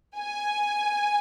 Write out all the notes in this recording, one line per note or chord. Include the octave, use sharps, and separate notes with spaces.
G#5